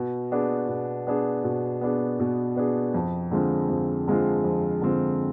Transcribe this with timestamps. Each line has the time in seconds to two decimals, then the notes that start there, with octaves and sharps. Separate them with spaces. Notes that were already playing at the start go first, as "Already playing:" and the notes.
Already playing: B2
0.32 B3 D4 G#4
0.68 B2
1.07 B3 D4 G#4
1.44 B2
1.81 B3 D4 G#4
2.20 B2
2.56 B3 D4 G#4
2.94 F2
3.31 D3 G#3 C4 F4
3.69 F2
4.08 D3 G#3 C4 F4
4.44 F2
4.82 D3 G#3 C4 F4